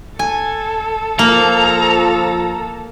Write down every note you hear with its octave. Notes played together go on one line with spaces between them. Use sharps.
A4 G#5
F3 A#3 A4 A#5